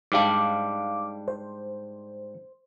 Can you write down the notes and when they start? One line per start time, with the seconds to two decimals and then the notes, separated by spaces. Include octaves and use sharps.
0.12 G#2 G3 D4 F5 D6
1.28 C5